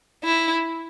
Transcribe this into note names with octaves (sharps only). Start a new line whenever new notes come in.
E4